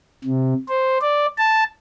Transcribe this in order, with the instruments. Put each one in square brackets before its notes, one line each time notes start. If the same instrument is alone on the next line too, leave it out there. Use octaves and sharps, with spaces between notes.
[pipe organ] C3
C5
D5
A5